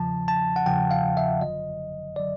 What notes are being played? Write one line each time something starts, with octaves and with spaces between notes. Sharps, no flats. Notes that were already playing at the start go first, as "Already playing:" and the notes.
Already playing: E2 C#3 F3 A5
A5
F#5
E2 C#3 F3 G5
F5
E5
G1 F#2 D3 F#3 D#5
D3 F#3 D5